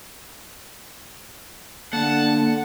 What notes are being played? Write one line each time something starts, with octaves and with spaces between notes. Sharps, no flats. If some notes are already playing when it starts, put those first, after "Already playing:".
D3 A#3 F#5 A5